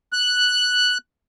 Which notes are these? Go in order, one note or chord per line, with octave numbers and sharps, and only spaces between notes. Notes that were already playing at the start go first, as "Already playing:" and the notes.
F#6